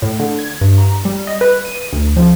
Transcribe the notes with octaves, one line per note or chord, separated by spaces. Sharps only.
A2
D3
G#6
G2
A#5
G3
D#5
B4
D#7
D2
F3